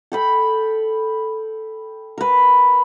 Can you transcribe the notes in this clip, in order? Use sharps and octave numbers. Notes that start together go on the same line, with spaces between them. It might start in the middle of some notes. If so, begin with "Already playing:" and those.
A4 G5 B5
A#4 B4